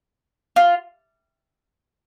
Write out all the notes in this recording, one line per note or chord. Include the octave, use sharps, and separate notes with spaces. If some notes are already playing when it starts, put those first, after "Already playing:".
F4